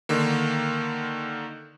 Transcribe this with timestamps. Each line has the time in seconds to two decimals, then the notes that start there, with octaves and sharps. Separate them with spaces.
0.09 D3 D#3 A#3